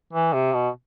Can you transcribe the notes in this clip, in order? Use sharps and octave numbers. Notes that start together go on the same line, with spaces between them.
E3
C3
B2